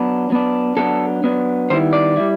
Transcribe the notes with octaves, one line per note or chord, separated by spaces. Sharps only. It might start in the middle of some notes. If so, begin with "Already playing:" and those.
Already playing: F#3 B3 D4
F#3 B3 D4
F#3 B3 D4 A4
F#3 B3 D4
D#3 G3 B3 E4 C5
D5
G3 B3 E4